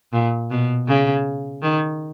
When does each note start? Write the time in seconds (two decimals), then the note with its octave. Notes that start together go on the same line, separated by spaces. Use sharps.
0.13 A#2
0.51 B2
0.87 C#3
1.62 D#3